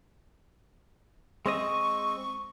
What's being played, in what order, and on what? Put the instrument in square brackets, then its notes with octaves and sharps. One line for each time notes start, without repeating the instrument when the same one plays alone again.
[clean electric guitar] G#3 C4 D#5 [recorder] C#6